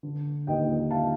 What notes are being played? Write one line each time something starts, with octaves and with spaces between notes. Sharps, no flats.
D3
D#2 D#5 G5
F5 A5